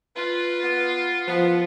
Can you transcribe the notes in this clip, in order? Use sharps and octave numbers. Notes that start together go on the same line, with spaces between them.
F4 B4
B3
F3 B3